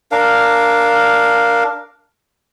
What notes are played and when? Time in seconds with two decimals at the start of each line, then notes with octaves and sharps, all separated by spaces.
0.12 D4 A#4 F5